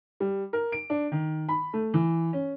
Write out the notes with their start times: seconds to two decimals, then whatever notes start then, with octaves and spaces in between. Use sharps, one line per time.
0.20 G3
0.53 A#4
0.72 D7
0.90 D4
1.12 D#3
1.49 B5
1.73 A3
1.94 E3
2.33 C#4